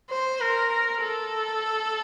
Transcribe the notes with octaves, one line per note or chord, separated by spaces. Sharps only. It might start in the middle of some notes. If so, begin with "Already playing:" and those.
C5
A#4
A4